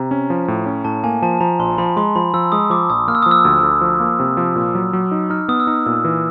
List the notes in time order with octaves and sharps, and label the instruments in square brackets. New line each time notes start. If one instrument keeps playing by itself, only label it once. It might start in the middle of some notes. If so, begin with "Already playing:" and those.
Already playing: [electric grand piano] C3 [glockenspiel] A#5
[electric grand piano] C#4
F3
A2
C#4
[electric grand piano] A2 [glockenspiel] A5
[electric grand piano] A#3 [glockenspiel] G#5
[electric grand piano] F3 [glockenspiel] A5
[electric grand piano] F3 [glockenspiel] A#5
[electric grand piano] A#1 [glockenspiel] C6
[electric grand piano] F3 [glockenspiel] B5
[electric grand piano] G#3 [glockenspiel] C6
[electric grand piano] F3 [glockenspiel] B5
[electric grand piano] F3 [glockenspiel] E6
[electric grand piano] G#3 [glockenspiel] D#6
[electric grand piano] F3 [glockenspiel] D6
[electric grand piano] A#1 [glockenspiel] D#6
[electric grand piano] A#3 [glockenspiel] F6
[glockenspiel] E6
D#6
[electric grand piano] F3
[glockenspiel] E6
[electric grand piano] D2
D2
F3
A#3
C3
F3
A#2
F#3
F#3
D#4
[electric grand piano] D#4 [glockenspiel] F6
[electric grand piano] B3 [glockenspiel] D#6
[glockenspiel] E6
[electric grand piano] D#4 [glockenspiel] D#6
[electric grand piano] A#2 [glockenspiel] E6
[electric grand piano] E3